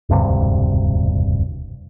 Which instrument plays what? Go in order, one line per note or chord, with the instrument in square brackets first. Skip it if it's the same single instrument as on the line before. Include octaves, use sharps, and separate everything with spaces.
[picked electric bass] E1 D2 G2 C3